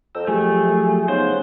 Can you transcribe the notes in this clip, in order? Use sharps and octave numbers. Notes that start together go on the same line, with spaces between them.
F2 G5 A#5 E6
F3 F#3 A3 G4 G#4
C#3 B3 D#4 C5 F#5